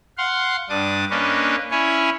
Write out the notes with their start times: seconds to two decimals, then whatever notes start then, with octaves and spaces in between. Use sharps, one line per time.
0.18 F5 F#5 C6
0.70 G2 D4 D6 D#6
1.11 A#3 C#4 D4 B4 C#5 D#5
1.71 C#4 E4 C#5 G#5